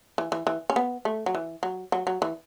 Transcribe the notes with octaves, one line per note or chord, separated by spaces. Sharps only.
E3
E3
E3
C#4
B3
A3
F#3
E3
F#3
F#3
F#3
E3